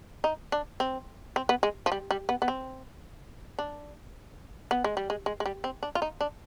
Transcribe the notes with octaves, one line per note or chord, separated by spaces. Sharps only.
D#4
D4
C4
C4
B3
G#3
F3
G3
G3
B3
B3
C4
D4
B3
G#3
G3
G#3
G#3
G#3
G3
C4
D4
F4
D#4
D4